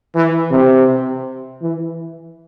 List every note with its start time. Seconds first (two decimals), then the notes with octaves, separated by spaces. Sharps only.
0.15 E3
0.51 C3
1.62 E3